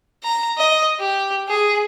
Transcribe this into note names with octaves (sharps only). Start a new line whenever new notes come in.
A#5
D#5
G4
G#4